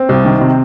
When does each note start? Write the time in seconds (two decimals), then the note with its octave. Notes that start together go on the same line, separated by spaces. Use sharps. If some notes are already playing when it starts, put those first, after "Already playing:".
Already playing: C4
0.09 C2
0.25 D#3
0.41 C3